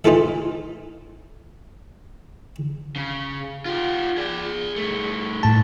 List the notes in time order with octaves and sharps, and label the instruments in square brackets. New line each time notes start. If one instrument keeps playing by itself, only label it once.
[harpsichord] E3 D#4 F4 A4 E5
[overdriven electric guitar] C#3
F4 G4
G#4 D5
G2 A3
[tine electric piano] A2 A5